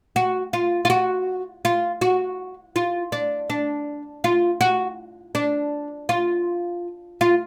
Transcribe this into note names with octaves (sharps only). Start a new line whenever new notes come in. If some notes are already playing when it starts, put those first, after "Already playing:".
F#4
F4
F4
F#4
F4
F#4
F4
D4
D4
F4
F#4
D4
F4
F4